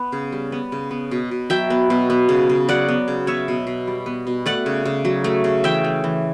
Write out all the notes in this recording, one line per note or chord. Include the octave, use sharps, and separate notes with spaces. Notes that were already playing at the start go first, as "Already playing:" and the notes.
Already playing: B3
C#3
G3
B3
C#3
B3
B2
B2
F#3 E5 G5
B3
B2
B3
C#3
C#3
F#3 D5 F#5
B3
C#3
B3 C#5 E5
B2
B2
G3
B3
B2
A3 D5 F#5
C#3
C#3
F#3
A3
C#3
E3 E5 G5
A3
E3